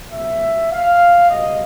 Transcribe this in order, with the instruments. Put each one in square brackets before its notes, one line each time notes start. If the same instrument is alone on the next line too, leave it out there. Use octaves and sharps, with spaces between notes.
[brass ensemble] C#2 B2 F#3 B3 E5
F5
C#2 B2 G3 D#5